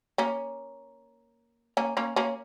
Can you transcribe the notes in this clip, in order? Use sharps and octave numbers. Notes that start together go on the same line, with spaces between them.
A#3 C#4
A#3 C#4
A#3 C#4
A#3 C#4